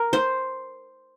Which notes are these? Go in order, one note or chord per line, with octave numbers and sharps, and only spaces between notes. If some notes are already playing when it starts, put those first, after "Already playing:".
Already playing: A#4
C5